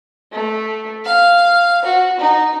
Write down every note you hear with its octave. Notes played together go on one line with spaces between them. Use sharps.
A3
F5
F#4
D#4